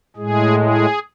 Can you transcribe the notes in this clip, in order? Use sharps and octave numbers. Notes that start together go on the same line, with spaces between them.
A2 G#3 G#4
G#4